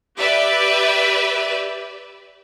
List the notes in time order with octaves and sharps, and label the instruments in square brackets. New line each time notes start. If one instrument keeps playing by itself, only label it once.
[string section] G4 B4 D5 E5